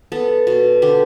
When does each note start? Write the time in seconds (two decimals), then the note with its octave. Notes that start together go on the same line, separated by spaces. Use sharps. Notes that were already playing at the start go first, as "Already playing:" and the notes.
0.12 B3 A4
0.47 B2
0.82 D3 G4